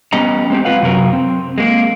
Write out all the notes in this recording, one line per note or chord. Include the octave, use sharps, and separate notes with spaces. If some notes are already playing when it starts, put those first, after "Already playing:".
G3 B3 C#4 D#5 A#5
G#3 C4 G4
G#3 F4 B4 F5 F#5
F#2 C3 F#3 A#4 F5
C4
G#3 A#3